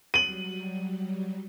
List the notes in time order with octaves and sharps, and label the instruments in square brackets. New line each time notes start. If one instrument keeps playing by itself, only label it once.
[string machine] F#3 G3 [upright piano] D#7 F#7